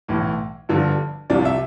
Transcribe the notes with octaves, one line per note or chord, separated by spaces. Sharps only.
B1 A2 E3
G1 G2 D3 F3
C2 C3 F3 D5
E5